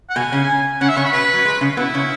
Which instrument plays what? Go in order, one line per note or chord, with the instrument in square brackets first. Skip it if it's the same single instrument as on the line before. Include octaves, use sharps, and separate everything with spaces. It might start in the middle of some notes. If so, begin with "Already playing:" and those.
[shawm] F#5
[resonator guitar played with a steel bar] B2 B3 [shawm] G#5
[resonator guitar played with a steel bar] C#3 C#4
[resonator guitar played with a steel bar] C#3 C#4 [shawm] F#5
[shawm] E5
[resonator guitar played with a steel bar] C#3 C#4 [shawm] C#6
[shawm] B5
[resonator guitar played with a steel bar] B2 B3 [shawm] B4
[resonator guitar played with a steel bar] F#3
G#3
C#3 C#4
[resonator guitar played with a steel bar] B2 B3 [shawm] E4
[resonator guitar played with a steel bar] C#3 C#4